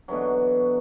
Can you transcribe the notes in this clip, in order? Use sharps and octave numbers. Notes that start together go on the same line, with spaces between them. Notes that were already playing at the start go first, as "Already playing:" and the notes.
B2 D3 E3 F#3